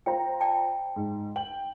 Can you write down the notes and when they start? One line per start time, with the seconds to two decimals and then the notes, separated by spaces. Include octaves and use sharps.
0.06 F4 C5 G5 A#5
0.40 D5 G5 A5
0.96 G#2
1.36 G5 F#7